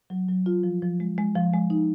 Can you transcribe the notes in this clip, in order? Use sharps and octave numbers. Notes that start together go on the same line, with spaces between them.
F#3
F#3
F4
F3
F3
G#3
G#3
F3
G#3
D#4